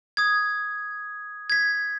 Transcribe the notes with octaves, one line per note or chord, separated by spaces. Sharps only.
D#6 G#6
G#6 B6